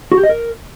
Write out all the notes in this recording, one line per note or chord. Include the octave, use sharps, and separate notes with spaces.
F#4
G4
D#5
A#4